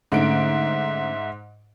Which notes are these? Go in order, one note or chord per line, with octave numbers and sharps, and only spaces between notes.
G#2 D3 A3 C#4 E5 D7